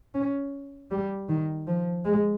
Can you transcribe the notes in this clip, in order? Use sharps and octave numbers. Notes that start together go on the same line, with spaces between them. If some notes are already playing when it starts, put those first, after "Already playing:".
C#4
G3
D#3
F3
G#3